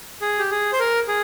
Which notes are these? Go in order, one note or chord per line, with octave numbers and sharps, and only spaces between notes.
G#4
G4
G#4
C5
A#4
G#4